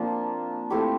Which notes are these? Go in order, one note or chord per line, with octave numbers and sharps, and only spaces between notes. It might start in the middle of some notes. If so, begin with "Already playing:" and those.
Already playing: F3 A#3 C4 D4 F4
A3 C4 E4 G4